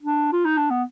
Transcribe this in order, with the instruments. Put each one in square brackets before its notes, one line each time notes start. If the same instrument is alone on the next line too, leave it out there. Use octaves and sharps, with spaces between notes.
[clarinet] D4
F4
D#4
D4
B3